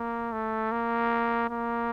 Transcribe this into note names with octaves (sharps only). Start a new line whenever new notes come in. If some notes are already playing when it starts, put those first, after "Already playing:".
Already playing: A#3
A3
A#3
A#3